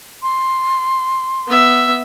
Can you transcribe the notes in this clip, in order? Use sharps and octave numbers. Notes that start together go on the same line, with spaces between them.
C6
B3 E5